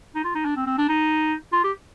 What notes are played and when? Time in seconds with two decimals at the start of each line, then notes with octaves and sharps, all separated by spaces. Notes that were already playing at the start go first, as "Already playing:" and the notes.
0.15 D#4
0.24 F4
0.35 D#4
0.45 D4
0.56 C4
0.67 C4
0.78 D4
0.89 D#4
1.53 F4
1.64 G4